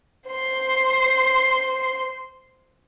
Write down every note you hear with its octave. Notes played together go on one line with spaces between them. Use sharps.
C5 C6